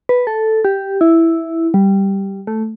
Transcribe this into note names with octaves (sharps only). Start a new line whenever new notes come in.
B4
A4
G4
E4
G3
A3